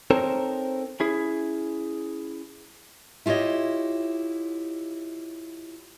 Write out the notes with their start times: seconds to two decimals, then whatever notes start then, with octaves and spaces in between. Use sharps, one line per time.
0.11 C4 D#4 A4 A#4 C5 C#5
1.00 C#4 E4 G#4
3.26 E4 F4 G4 C#5 D#5